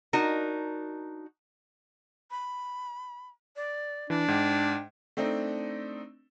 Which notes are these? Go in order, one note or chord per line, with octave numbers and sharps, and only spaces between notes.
D4 D#4 F#4 A#4
B5
D5
E3 D4
G#2 G5
A3 C4 D4 D#4